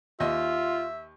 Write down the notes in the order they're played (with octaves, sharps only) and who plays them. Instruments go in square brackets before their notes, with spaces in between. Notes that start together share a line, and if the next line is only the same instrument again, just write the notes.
[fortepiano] D#2 D#5 [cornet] F4 [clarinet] E5